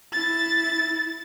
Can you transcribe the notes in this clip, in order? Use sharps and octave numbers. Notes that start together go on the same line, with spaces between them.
E4 A6